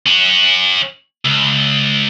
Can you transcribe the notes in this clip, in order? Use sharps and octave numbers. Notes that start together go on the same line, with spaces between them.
C#4 F#4
C#2